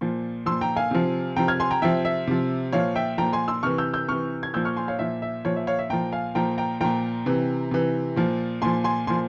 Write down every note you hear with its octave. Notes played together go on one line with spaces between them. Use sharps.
A#2 F3
A#2 F3 C6 E6
G5 A#5
F5 G#5
C3 F3
C3 F3 G5 A#5
F6 G#6
G#5 C6
G5 A#5
C3 F3 E5 G5
E5
C3 F3
A#2 F3 C#5 F5
E5 G5
A#2 F3 G5 A#5
G#5 C6
C6 E6
C3 E3 C#6 F6
E6 G6
E6 G6
C3 E3 C#6 F6
G#6
A#2 F3 E6 G6
C#6 F6
G#5 C6
C#5 F5
A#2 F3 E5
E5
A#2 F3 C#5
E5
C#5 F5
E5
A#2 F3 G5 A#5
F5 G#5
A#2 F3 G5 A#5
G5 A#5
A#2 F3 G5 A#5
C3 E3
C3 E3
A#2 F3
A#2 F3 G#5 C6
G#5 C6
A#2 F3 G#5 C6